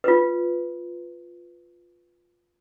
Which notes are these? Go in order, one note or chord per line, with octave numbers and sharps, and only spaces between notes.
F4 B4